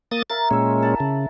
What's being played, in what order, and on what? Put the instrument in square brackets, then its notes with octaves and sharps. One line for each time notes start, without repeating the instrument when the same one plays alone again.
[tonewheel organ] A#3 D#6 A6
[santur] A#4 E5 F5 [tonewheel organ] A6
[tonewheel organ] A#2 G#3 C#4 [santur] E5 G5
[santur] E4 F#5 A5
[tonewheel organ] C#3